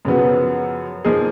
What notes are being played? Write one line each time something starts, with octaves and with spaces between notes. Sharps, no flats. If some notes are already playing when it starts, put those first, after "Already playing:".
F#2 C#3 F3 B3 F#4
F3 A#3 D#4 G#4